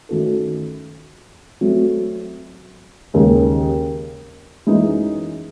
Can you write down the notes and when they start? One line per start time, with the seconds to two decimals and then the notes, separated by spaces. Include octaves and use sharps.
0.09 D#3 A3 C#4 F#4 A4
1.61 F#3 A3 C4 F#4
3.14 D#2 C#3 G#3
4.67 F#2 E3 G#3 D#4